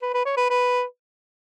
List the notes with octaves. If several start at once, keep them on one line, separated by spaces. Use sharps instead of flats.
B4
B4
C#5
B4
B4